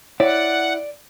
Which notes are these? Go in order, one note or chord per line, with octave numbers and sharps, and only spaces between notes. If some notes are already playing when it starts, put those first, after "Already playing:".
E4 C#5 D5 F#5